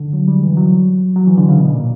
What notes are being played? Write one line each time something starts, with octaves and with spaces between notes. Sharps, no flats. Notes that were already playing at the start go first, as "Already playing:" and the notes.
Already playing: D3
F#3
G3
E3
F#3
F#3
E3
D3
C#3
B2
A#2